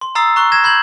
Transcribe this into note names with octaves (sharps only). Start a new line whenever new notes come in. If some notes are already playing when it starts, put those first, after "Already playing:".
C6
A#5 D#6 E6 A6 C7
A#5 C#6 F#6 G7
G#6 A#6 E7
B5 G6 G#6 F#7